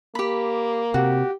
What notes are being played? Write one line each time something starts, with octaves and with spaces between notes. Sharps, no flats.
A#3 G4 B5
C3 F#4 G4